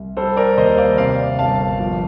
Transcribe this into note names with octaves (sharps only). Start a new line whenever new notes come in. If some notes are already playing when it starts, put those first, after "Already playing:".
Already playing: C2
G3 A4 C5
A#4 D5
D#2 C5 D#5
D5 F5
C3 D5 F5
G1 F5 A5
F3